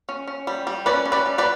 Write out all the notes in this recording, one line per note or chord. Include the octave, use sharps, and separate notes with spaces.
C#4
C#4
G3
G3
C#4 B4 D5
C#4
B4 D5
G3
B4 D5